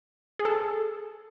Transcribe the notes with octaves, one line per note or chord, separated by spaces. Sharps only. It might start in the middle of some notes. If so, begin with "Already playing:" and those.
G#4
A4